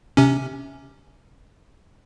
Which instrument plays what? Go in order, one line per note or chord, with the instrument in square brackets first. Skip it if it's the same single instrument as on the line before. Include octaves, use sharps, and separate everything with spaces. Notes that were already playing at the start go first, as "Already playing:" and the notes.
[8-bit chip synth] C3 C#4